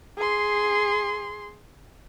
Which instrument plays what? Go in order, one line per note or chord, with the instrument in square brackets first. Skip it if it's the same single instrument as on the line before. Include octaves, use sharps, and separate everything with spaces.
[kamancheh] G#4 C6